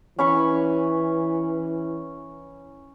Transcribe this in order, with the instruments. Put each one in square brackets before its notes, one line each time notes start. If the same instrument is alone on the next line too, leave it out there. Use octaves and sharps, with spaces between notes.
[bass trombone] E3 [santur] C#4 B5 C#6